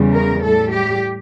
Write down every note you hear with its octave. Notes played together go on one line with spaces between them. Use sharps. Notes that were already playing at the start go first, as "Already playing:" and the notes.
Already playing: E2 C#3 G3
A#4
A2 G3 A4
G4